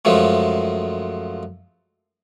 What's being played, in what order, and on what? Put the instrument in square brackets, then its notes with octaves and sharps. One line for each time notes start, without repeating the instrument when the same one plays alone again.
[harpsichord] F#2 F3 G#3 A3